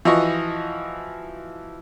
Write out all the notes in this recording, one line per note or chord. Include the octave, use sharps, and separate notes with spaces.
E3 F3 F#4 D#5 C#6